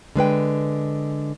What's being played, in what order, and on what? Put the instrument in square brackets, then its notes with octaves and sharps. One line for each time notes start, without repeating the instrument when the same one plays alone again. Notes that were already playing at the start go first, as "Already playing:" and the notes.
[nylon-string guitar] D3 G#3 B4 G5